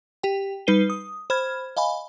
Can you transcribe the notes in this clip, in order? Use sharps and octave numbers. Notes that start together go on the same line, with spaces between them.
G4 G5
G3 D#4 B4 C7 D#7 G7
D#6
C5 B5 F6 G#6
D#5 F5 G#5 B5